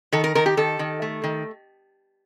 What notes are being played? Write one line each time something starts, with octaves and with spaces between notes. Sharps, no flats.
D#3 A4
A#4
D#3 A#4
G4
D#3 A4
D#3
A3
D#3